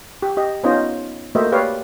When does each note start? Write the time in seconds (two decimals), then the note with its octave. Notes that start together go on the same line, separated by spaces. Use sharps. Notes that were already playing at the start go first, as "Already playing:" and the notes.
0.22 G4
0.37 G4 D#5
0.64 B3 C#4 D#4 F4 C5 D#5
1.35 A3 A#3 F#4 C5 D#5 E5
1.52 G4 B4 C#5 D5 F5